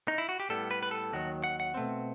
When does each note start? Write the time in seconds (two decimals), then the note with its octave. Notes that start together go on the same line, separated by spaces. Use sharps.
0.08 D#4
0.18 E4
0.29 F#4
0.40 G4
0.50 A2 G3 B3 A4
0.71 B4
0.83 B4
0.91 A4
1.13 D#2 D#3 F#3 F#4
1.44 F#5
1.60 F#5
1.74 B2 A3 C4